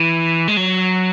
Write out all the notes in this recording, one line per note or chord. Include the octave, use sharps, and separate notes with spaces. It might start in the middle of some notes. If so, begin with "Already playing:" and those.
Already playing: E3
G#3
F#3